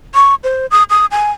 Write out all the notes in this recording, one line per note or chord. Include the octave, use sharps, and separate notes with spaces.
C#6
C5
D#6
D#6
G#5